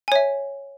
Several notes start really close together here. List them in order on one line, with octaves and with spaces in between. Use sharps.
G#5 C#5 E5